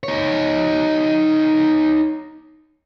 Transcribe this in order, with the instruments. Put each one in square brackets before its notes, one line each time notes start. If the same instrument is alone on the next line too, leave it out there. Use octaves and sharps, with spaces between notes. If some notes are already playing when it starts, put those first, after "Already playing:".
[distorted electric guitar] D#4 C#5